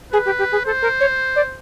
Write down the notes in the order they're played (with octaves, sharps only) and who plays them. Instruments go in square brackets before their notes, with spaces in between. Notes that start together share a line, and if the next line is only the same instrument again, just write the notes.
[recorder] G#4 [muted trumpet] B4
[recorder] G4
G4
G#4
[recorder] A4 [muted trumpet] C5
[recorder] A#4
C#5
D5